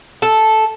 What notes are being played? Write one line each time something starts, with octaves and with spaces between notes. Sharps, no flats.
A4